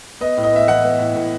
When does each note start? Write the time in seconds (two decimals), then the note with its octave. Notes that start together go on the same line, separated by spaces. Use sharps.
0.21 B3 D#5
0.37 A2
0.43 D#5
0.52 B3 E5
0.68 E3 F#5
0.84 B3
0.99 A2
1.15 A2